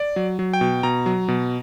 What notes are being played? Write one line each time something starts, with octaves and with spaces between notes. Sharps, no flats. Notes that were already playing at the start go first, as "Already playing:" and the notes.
Already playing: D5
F#3
F#3
G5
B2
B2 A#5
F#3
B2